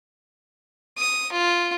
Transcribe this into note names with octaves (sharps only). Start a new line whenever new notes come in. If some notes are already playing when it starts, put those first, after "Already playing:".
D#6
F4